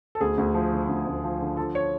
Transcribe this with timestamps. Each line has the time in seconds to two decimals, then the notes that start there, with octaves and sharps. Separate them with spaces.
0.15 A4
0.21 D2 G#4
0.38 D2
0.54 F3
0.72 D3
0.89 D2
1.07 D2
1.24 F3
1.41 D3
1.57 F3 A4
1.75 C#5